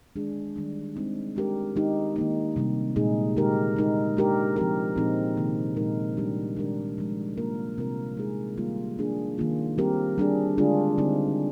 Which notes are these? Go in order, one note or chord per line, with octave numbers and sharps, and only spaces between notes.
D#3 G#3 D4 G#4
D#3 G3 D4
G#3 C4 D#4
G#3 D4 G4 A#4
D#3 G#3 D#4 G4
D#3 A#3 D#4
C3 G3 A#3
A#2 G#3 D#4 G#4
D3 G#3 D#4 G4 A#4
G#3 D#4 A#4
G#3 D4 G4 A#4
F3 C4 G4 A#4
A#2 F3 C4 D#4 G#4
C3 D#3 A#3
A#2 G#3 D#4 A#4
D#3 G3 D4 G4
D#3 G#3 D4 G4 A#4
A#2 F3 G#3
C3 F3 A#3 F4 A#4
C3 G3 C4 F4 A#4
G#3 D#4 G#4
D#3 G3 A#3 F4
F3 A#3 D4 G#4
D#3 A#3 F4
G3 C4 G4 A#4
G3 D4 G#4
D3 G#3 D4 F4 G#4
D3 G3 C4 D#4